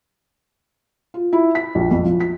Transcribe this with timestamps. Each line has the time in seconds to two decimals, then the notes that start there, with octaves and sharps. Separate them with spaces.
1.14 F4
1.33 E4
1.55 B6
1.75 A#1
1.91 F2
2.05 F3
2.20 B6